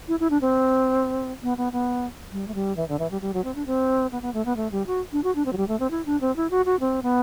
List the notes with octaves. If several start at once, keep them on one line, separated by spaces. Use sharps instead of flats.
E4
E4
D4
C4
B3
B3
B3
G3
A3
G3
E3
D3
E3
G3
G3
F#3
C4
D4
C4
B3
B3
A3
B3
A3
G3
F#4
D4
F#4
D4
C4
F#3
G3
A3
C4
E4
D4
C4
E4
F#4
F#4
C4
B3